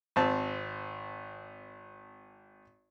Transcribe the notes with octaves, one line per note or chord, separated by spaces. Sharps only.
G#1 C4 A5